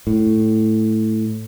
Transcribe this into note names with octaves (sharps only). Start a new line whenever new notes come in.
A2